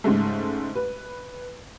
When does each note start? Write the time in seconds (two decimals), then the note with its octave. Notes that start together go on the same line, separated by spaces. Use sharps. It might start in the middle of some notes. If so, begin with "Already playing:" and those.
0.04 G#2 C#3 G#3 A3
0.75 B4